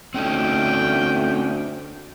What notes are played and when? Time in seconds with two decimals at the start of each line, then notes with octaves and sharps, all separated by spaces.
0.14 D2 A3 C4 C#4 D#4 G5